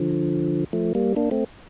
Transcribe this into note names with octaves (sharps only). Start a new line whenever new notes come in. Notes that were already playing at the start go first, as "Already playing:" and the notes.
Already playing: D3 F3
F3 A3
G3 A#3
A#3 D4
A3 C4